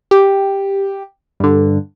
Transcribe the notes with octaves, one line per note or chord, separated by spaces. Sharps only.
G4
G2 D3